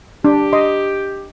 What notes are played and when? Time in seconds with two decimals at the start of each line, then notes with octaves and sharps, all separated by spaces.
0.24 D4 G4
0.53 D#5 C6